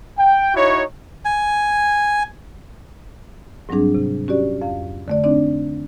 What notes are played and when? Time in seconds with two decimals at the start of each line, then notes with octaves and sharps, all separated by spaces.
0.18 G5
0.55 D#4 E4 F#4 C#5
1.25 G#5
3.69 G#2 F#3 G3 C4 D4 G#4
3.95 C3
4.28 C#4 F#4 G4 D5
4.61 F2 F5
5.08 D3 A3 D5
5.24 C4 D4 D#4 D5